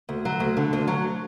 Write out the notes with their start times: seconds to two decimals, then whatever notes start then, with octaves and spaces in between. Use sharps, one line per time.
0.09 D2
0.25 F#3
0.40 D2
0.57 D3
0.73 D2
0.88 F#3